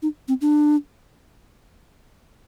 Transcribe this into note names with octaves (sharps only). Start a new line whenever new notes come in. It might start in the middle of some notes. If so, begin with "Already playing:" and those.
D#4
C4
D4